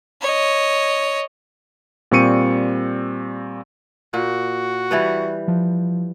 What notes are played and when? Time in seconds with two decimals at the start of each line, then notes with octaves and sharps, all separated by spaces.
0.22 C#5 D#5
2.11 A#2 G3 C4 C#6 C#7 D#7
4.14 A#2 F#4
4.91 E3 G3 B4
5.48 F3